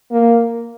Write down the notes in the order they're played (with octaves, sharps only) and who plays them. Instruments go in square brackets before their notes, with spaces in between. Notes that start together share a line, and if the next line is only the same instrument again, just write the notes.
[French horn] A#3